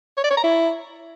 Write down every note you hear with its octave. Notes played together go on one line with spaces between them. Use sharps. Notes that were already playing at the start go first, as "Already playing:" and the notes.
C#5
D5
C#5
A#5
E4